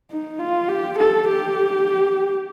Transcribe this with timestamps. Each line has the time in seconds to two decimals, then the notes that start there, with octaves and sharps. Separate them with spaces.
0.11 D#4
0.39 F4
0.68 G4
0.98 A4
1.28 G4